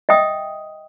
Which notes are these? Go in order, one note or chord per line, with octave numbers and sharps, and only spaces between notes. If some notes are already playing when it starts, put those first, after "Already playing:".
D#5 E5 G5 D#6